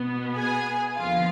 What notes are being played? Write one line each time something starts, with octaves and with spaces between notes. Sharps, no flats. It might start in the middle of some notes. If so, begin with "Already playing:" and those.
Already playing: B2 B3
G#4 G#5
D#2 D3 F3 B3 F4 F5